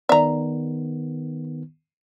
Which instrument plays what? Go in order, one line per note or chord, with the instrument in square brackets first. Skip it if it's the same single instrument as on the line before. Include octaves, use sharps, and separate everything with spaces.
[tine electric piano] D#3 B3 [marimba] D5 [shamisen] E5 A#5